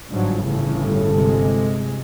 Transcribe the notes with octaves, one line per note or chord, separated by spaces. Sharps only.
G1 G#2 F3 F#3 D4
A2 C#3 E3
A4
C3 G#3